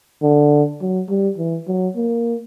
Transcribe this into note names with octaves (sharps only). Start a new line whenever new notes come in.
D3
F#3
G3
E3
F#3
A#3